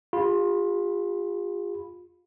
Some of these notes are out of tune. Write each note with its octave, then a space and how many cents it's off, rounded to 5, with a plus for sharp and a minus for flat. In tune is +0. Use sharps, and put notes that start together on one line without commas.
F4 +20 G#4 -45 B5 +0